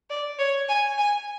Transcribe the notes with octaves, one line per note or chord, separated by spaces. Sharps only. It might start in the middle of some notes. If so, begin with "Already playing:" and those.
D5
C#5
G#5
G#5